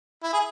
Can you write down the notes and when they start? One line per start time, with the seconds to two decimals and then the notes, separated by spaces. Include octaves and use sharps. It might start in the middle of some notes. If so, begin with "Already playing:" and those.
0.23 E4
0.33 G#4